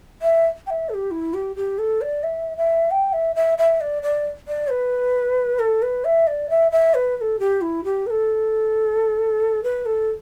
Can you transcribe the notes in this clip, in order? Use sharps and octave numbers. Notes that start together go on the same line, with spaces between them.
E5
G5
E5
A4
G4
E4
G4
G4
A4
D5
E5
E5
G5
E5
E5
E5
D5
D5
D5
B4
A4
B4
E5
D5
E5
E5
B4
B4
A4
G4
E4
G4
B4
A4
B4
A4